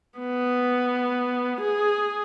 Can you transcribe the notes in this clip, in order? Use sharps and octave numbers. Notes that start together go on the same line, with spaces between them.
B3
G#4